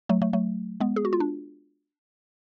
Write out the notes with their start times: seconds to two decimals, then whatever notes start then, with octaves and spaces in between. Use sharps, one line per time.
0.09 F#3 A3
0.22 F#3 A3
0.33 F#3 A3
0.80 G#3 B3
0.96 G#4
1.05 F#4
1.13 F4
1.20 D4